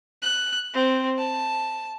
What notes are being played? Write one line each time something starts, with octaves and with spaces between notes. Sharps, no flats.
F#6
C4
A5